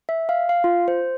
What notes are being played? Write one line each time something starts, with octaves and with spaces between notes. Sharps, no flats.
E5
F5
F5
F4
C5